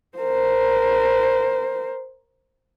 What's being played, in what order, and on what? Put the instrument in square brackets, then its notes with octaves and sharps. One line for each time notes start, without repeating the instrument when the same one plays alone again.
[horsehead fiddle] A#4 C5